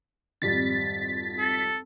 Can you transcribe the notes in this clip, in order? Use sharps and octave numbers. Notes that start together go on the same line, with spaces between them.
G#1 F2 G3 A6 B6
A4